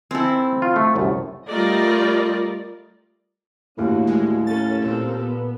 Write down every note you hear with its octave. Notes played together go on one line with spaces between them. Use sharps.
C4 E4 A4 G#5
F4
A3
C2 F#2
G3 A3 F4 A#4 D5 D#5
D#2 A2 D3 A#3 F#4
G#3
C#4 A4 A#4 A6
A#2 C4 A4 A#4
B3